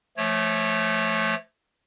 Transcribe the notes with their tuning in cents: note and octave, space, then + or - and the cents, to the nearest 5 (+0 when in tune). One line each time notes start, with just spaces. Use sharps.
F3 -35 A3 -5 C#5 -20